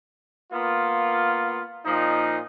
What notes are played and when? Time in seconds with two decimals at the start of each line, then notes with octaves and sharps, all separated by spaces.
0.52 A#3 B3 F4
1.85 A#2 F3 D#4